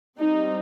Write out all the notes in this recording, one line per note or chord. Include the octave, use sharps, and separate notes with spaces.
G3 C4 D#4